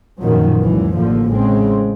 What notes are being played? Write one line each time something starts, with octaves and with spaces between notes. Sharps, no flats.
F#2 A#2 D#3 F3 F#3
C#2 F#2 A#2 E3
A1 A2 D3 F3 A#3
A2 C#3 G#3 C4